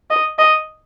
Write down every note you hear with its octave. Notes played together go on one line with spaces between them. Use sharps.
D#5
D#5